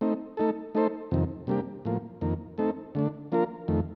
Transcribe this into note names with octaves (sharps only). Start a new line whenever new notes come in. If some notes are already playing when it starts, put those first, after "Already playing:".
A3 C4 D#4
A3 D#4 A4
A3 D#4 A4 C5
F2 C3 D#3
C3 G3 A#3 D4 G4
A2 F3 A#3
F2 D#3 A#3
A3 C4 D#4 A4
D3 A3 D4
F3 A#3 D4 F4 A#4
F2 D#3 A3